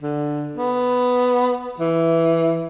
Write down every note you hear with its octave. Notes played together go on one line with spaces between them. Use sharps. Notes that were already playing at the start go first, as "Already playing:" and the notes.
D3
B3
E3